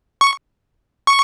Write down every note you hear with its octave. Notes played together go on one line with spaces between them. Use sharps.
C#6
C#6